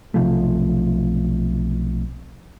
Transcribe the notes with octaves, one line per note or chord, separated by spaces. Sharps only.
B1 C3 F3 A3